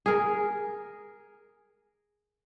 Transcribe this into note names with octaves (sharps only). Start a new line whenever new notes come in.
G#4 A#4